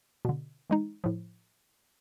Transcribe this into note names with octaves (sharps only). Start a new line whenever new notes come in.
B2 D3
E3 G#3 D#4
A2 F3